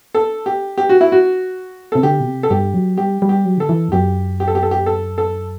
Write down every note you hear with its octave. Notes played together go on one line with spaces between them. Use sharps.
A4
G4
G4
F#4
E4
F#4
C3 A4
D3 G4
B2
C3
A4
G2 G4
F#3
G3 G4
G3
G4
F#3
D3 A4
E3
E2
F#2 G4
G4
A4
G4
A4
G4
A4
A4